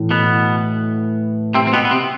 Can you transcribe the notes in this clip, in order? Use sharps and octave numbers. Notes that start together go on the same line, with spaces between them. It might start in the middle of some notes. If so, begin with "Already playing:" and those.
Already playing: A2 E3 A3 E4
B2 B3
C3 C4
C4
B2 B3
B3
C3 C4